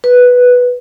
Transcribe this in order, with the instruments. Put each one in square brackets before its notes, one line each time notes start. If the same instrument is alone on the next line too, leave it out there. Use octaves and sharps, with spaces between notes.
[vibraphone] B4